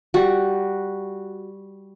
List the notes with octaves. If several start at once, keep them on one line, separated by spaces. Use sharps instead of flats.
G3 F#4